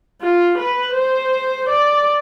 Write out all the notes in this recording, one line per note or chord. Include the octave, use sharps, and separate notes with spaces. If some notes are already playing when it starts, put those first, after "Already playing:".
F4
B4
C5
D5